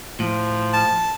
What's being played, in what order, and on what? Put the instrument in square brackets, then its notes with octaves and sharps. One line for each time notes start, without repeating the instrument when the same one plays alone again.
[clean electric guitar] A2 [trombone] F3
[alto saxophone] A5